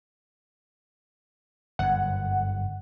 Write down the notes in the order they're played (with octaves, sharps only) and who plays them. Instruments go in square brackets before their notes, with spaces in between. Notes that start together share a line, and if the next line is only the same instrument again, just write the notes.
[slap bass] G1 F#2 [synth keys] F#5